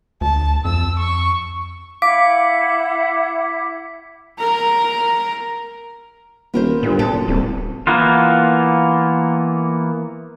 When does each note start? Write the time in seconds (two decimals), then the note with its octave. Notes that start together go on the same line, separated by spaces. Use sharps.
0.21 D2 A5
0.65 F2 E6
0.99 C#6
2.02 E4 F5 F#5 D6 B6
4.39 A#4 A#5
6.54 D#1 B3 A#4 C5
6.83 G1 A#2
6.99 A#2 B3 A4
7.11 F#1
7.28 D1 C2
7.87 E3 A#3 B3 F4